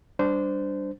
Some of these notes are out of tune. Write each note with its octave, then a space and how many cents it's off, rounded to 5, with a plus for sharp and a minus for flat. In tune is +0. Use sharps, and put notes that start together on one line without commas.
G3 +0 D4 +0 C5 -20